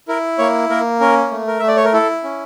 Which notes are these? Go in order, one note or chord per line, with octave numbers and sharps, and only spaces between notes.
E4 A#4
A#3 C#5
A#3 A#4
C#4 A#4
A3
A#4
A3 E5
D5
C#5
A#4
E4 A4
C#4